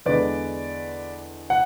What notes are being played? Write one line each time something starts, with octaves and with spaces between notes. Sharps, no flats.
E2 D3 G#3 B4 D5
F#5